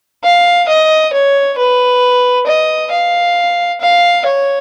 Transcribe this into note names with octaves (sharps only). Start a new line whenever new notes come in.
F5
D#5
C#5
B4
D#5
F5
F5
C#5